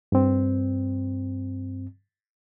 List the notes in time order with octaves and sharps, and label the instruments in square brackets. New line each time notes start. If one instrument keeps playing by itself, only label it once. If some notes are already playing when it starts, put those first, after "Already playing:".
[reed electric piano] G2 C4